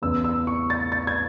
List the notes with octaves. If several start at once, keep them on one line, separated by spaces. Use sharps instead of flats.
E2 C#3 E3 E6
E6
C#6
A6
A6
G#6